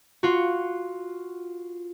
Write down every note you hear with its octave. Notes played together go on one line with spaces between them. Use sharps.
F4 F#4